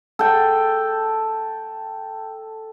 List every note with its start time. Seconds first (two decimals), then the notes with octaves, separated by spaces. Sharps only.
0.19 A4 G5